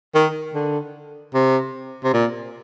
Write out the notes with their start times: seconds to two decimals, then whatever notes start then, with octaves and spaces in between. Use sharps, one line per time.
0.15 D#3
0.55 D3
1.34 C3
2.04 C3
2.14 A#2